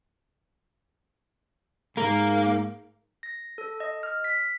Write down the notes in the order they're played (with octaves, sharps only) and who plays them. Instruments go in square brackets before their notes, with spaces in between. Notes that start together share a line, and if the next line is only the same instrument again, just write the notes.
[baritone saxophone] G#2 [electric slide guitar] A#3 [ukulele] A#4
[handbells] A#6
A4
D#5
F6
B6